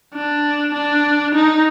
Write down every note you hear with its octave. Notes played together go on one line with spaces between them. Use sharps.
D4
D4
D#4